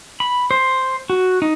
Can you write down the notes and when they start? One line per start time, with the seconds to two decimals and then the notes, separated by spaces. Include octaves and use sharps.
0.20 B5
0.51 C5
1.10 F#4
1.42 D#4